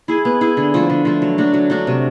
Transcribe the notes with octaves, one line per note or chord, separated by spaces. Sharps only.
E4 G#4
B3
E4 G#4
D3
F3 A3
D3
F3 A3
F#3
A3 D4 F#4
F#3
A3 D4 F#4
C3